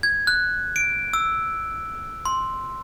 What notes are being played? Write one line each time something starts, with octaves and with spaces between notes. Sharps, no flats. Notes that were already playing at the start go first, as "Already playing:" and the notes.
G#6
F#6
D7
E6
C6